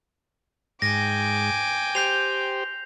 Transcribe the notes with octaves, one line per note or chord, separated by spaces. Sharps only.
G#2 G5 G#5 D6 A#6
G4 C5 G6 C7 F7